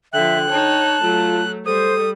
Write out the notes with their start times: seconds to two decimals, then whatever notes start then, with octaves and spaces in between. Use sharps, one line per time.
0.13 D3 F3 E5 G5 F#6
0.50 D#4 C#5 A5
1.02 F#3 A3 F4
1.66 G3 A4 C5 D#6